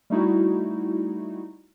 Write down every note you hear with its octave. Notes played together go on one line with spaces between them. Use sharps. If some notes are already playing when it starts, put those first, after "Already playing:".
G3 A3 D#4 E4 F#4